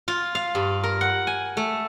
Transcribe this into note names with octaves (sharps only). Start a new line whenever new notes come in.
F4
F5
G2
A#4
F#5
G#5
A3